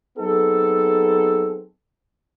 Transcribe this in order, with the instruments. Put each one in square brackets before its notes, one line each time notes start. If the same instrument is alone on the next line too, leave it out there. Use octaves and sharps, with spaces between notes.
[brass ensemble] F#3 B3 C4 D#4 G#4 A4